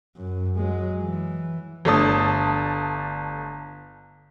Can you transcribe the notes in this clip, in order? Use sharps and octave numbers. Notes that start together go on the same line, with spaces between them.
F#2
F#3 G#3
E3
G1 A3 D4 A5 D#6